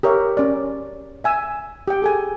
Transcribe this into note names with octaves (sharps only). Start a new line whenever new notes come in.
G4 A#4 C#5 E5
C#4 D5
E5 G#5 E6
G4 G5
G#4 A4 G#5